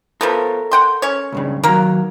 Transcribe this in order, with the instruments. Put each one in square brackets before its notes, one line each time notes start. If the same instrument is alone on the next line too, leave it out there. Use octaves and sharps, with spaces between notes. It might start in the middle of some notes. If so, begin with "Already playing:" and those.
[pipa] F3 A3 B3 [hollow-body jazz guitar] A4 A#4
[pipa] F#5 G5 C6
C#4 C#5
[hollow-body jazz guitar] C#2 G2 C#3
[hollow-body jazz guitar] D#3 F#3 [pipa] A#3 A#4